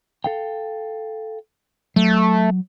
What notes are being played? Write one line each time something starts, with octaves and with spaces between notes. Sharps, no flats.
A4 F5 G5
F#3 A3